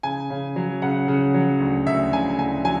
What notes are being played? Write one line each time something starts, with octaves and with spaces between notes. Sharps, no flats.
C#3 G#5
C#3
F#3
C#3 F#5
C#3
F#3
D2
D2 E5
C#3 G#5
D2 G#5
F#3 G#5